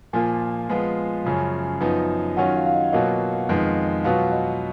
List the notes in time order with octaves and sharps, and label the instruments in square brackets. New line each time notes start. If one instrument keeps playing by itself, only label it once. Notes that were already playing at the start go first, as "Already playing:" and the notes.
[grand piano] A#2 F3 A#3 F4 [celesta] G#5
[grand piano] F3 G#3 B3 F4
F#2 C#3 F3
F#2 F3 B3 D#4
[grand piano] D#3 F#3 C#4 F4 [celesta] F#5
[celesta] F5
F5
D#5
[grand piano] B2 F#3 A#3 F4 [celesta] D#5
[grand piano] F2 D#3 G#3 B3 F4
[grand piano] B2 F#3 B3 F4 [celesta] F5
[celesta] D#5